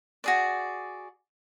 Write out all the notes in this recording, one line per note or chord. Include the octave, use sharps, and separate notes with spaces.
F#4 G#4 D5